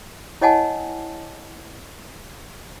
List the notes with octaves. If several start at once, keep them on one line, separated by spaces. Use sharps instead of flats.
E4 C#5 D#5 F#5 G#5 A5